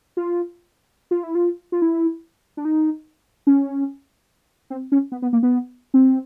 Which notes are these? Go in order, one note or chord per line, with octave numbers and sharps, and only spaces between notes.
F4
F4
E4
F4
F4
E4
D4
D#4
C#4
C4
C#4
B3
B3
A#3
B3
C4